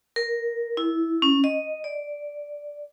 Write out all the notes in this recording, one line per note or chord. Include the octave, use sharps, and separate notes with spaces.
A#4
E4
C#4
D#5
D5